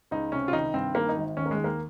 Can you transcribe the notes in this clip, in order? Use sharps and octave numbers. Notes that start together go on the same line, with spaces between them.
C#2 D#4
C3 C#4
F4
D#3 D#4
G2 C4
D#3 A#3
D#4
G#1
D#2 C#4
A#3
G#3
D#3
A#3